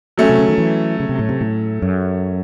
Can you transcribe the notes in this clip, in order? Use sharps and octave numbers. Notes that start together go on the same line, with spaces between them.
F#3 A3 C#4
C3
C#3
D#3
E3
C#3
C3
A2
C3
A2
F#2